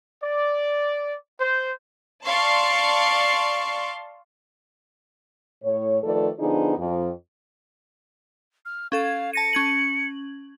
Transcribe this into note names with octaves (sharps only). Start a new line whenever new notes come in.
D5
C5
D5 F5 A5 C6 C#6
A2 C#5
D#3 F3 A3 A4 B4 D5
D3 F3 B3 D4 D#4 G#4
F2
F6
C#4 A4 F5 G#6
A5 A#6 C#7 D#7
C#4 G#6 F#7